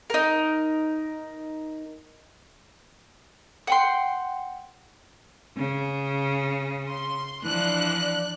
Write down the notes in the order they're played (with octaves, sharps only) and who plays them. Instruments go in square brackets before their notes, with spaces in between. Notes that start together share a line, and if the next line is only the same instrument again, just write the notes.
[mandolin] D#4 A#4
F#5 G5 C6
[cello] C#3
[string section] C6
[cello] E3 F3 [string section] D4 F#6